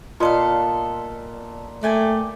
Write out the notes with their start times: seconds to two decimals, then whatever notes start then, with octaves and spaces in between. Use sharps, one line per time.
0.20 A#2 B3 F4 A4 D#5 F5 C6
1.83 A3 D5 G5 G#5